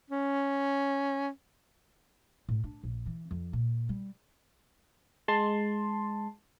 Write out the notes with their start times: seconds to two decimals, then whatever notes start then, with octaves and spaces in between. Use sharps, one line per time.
0.10 C#4
2.49 A2
2.64 D4
2.83 A#1
3.06 E3
3.31 F2
3.53 A#2
3.89 G3
5.28 G#3 A5 C6